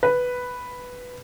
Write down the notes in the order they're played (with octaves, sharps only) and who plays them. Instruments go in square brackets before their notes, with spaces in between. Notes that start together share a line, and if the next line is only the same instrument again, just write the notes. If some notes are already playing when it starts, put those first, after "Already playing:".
[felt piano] B4